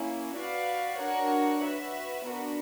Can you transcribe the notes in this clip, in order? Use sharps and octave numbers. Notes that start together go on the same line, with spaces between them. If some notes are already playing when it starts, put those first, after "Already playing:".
Already playing: A#3 C#4 E4
F#4 B4 D5 F5
D4 F#4 A#4 C#5 F#5
F#4 B4 E5
B3 D4 F#4 A#4